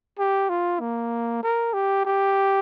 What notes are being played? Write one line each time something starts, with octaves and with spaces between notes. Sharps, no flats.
G4
F4
A#3
A#4
G4
G4